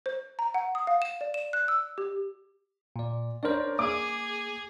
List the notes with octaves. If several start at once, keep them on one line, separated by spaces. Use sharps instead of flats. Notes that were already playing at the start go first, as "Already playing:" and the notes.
C5
A#5
F#5
D#6
F5
E7
D5
E7
F#6
E6
G4
A#2 D5
D4 A#4 C5 C#5
A#3 G#4 D6